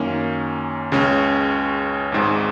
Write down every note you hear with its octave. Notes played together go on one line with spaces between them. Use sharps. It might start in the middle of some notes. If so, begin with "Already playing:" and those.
Already playing: F#2 D#3 A#3 C#4
C#2 C#3 G#3 C#4
G#1 G#2 G#3